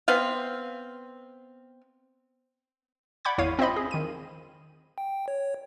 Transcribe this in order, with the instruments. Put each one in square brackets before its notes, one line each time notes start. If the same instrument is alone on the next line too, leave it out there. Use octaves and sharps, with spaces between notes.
[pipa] B3 C4 F5
[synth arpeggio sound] D5 F#5 B5 D6 G6 G#6
G#1 E2 E4 C#5 F5 D#7
C4 F4 C5 D#5 B5
G#4
D#3 D#7
[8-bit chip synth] G5
C#5